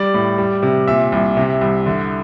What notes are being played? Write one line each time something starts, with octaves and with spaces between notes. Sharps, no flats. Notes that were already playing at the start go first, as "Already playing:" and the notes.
Already playing: G3 D5
A2
G3
C3
A#2 E5
C2
C3
C2
D3